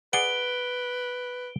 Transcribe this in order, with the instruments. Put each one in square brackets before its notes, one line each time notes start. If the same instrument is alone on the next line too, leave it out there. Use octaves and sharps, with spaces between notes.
[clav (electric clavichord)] G#4 D5 F#5 [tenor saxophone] B4 [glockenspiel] D7 G7